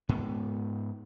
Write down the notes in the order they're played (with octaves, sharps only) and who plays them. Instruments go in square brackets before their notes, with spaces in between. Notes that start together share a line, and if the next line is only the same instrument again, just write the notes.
[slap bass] G#2 B3